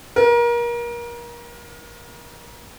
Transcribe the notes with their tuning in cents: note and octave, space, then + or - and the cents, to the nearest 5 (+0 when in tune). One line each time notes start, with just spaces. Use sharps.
A#4 +30